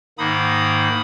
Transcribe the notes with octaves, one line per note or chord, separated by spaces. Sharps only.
G#2 D#3 A#3 D#4 B5 D#6